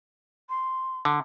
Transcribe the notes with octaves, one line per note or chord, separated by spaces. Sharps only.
C6
D3